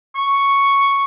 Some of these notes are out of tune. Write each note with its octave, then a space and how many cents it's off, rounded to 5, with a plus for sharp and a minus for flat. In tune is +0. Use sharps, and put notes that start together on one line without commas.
C#6 +0